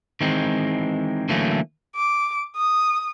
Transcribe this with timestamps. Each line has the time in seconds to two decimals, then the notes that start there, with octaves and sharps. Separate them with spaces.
0.21 D#3 E3 G#3 C4
1.29 D3 E3 F#3 A3 A#3 C#4
1.96 D6
2.56 D#6